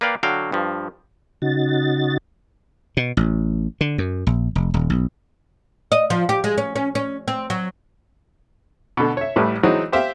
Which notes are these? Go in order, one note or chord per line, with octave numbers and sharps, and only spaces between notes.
A#3 B4 D5 F5 G5
D3 F#3 F#4 F5 G5
G2 F3
C#3 D#4 F#4 A6
B2
A1
D3
F#2
A#1
F1
D#1
B1
D#5
F3
G4
G#3
C#4
C#4
C#4
C4
F#3
B2 D3
C#5 E5
A1 A2 G3 B4
E3 F#3 G#3 C4 D#4 F#4
G4 C5 E5 F5 G5